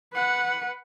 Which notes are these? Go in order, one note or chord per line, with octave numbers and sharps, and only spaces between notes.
B4 F#5